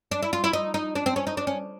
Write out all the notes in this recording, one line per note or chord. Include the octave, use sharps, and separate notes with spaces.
D4
E4
F4
E4
D#4
D#4
D4
C4
C#4
D#4
D4
C#4